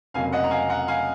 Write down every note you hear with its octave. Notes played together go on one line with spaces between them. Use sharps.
F1 F2 C#3 F#3 A#3 F5 G#5
D#5 F#5
A#5
F5 G#5
F#5 A#5
F5 G#5